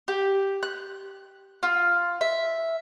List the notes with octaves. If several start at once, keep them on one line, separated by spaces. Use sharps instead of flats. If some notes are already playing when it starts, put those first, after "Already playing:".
G4
F#6
F4
E5